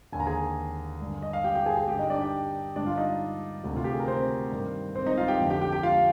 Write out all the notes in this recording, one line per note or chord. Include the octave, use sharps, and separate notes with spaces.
D#2 D3 G#5
A#5
G#4 G#5
G2 D3
D#5
F5
G4 G5
G4 G5
G#4 G#5
G#4 G#5
G2 D3 G4 G5
D#4 D#5
D4 D5
G4 G5
G2 D3 D4 D5
F4 F5
D#4 D#5
D2 C3 D#3
F4
G4
G#4
A#4
C4 C5
G2 D#3
C4 C5
D#4 D#5
F4 F5
G4 G5
F2 D3
G4 G5
G4 G5
G4 G5
F4 F5